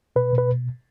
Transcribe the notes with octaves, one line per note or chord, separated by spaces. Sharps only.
B2 B4
B2
B4